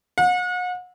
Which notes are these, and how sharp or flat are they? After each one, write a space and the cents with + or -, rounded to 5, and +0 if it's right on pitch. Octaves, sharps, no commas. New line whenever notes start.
F#5 -40